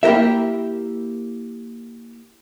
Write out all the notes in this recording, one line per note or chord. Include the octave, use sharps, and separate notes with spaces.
A#3 E4 G4 A#4 E5